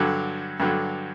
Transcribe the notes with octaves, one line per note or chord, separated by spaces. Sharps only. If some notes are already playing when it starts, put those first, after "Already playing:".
Already playing: G2 D3 F#3
G2 D3 F#3